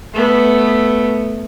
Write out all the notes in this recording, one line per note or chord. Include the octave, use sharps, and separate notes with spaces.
A3 B3